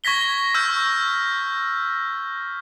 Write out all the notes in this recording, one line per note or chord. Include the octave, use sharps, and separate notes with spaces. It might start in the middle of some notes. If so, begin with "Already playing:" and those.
C#6 G#6 A#6 B6 G7
C#6 E6 F6 G6